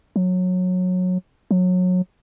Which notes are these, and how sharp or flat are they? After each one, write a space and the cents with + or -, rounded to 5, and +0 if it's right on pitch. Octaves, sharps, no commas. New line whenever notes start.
F#3 -20
F#3 -25